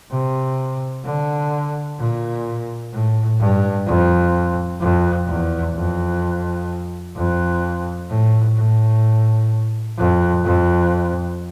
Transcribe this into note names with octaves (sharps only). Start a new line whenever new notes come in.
C3
D3
A#2
A2
G2
F2
F2
E2
F2
F2
A2
A2
F2
F2